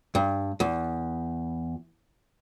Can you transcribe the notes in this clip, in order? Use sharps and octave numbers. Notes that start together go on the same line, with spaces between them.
G2
E2